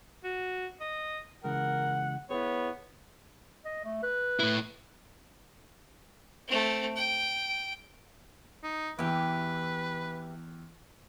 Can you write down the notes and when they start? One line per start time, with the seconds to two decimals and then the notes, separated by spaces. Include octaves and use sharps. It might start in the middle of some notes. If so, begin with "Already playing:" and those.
0.24 F#4
0.81 D#5
1.44 C#3 E3 G#3 A#4 F#5
2.30 B3 E4 G#4 C#5
3.65 D#5
3.85 A3
4.03 B4
4.40 A2 E4
6.48 A3 C4
6.96 G5
8.63 D#4
8.99 E2 E3 G4 B4 G5